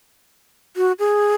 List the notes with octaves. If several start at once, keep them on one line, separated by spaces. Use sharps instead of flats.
F#4
G#4